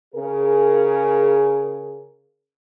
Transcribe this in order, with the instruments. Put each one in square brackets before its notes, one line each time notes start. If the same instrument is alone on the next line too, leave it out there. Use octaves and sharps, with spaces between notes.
[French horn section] C#3 G#4 A#4